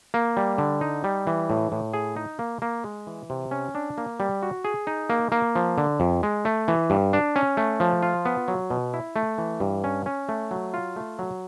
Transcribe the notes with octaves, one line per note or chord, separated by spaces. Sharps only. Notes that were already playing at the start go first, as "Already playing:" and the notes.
A#3
G3
D3
D#4
G3
E3
A2
A2
G#4
D#4
A#3
A#3
G#3
E3
C3
C#4
D4
A#3
G3
F#4
G#4
D#4
A#3
A#3
F3
D3
F2
G#3
A3
E3
G2
D4
C#4
A3
F3
F4
B3
F#3
B2
E4
A3
E3
G2
C#4
C#4
A3
F#3
F4
A3
F#3